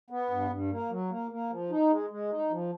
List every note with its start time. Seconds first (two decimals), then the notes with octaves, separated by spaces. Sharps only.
0.10 B3
0.30 G2
0.50 G2
0.71 A#3
0.90 F#3
1.10 A#3
1.31 A#3
1.50 F3
1.70 D#4
1.90 G#3
2.10 G#3
2.31 D#4
2.50 F3